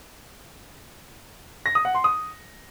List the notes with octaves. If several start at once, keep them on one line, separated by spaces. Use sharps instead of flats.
A#6
D#6
F#5
C6
D#6